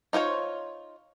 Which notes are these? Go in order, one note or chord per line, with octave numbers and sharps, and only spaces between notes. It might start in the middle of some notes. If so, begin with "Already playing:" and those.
D#4 F4 C5 C#5